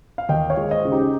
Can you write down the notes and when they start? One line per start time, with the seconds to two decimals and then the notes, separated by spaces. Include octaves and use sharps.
0.18 F5
0.29 D#2 D#5 G5
0.50 C#5 F5
0.57 G#3
0.71 C5 D#5
0.85 C#3
0.92 D#4 G4